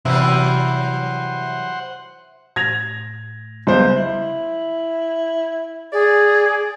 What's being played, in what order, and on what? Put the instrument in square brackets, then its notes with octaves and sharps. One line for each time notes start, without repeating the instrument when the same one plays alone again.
[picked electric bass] C3 [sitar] E3 F#3 G3 [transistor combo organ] C5 F#5 [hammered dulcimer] E5
[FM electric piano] A2 [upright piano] G#6 A#6 F7
[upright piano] C#2 C5 [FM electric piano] F#3 G3 B3
[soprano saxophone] E4
[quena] G#4 [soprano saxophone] D5